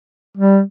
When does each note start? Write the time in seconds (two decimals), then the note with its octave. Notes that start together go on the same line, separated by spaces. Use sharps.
0.37 G3